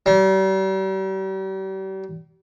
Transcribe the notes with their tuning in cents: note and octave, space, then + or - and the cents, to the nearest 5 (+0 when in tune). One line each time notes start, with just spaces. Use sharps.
G3 -40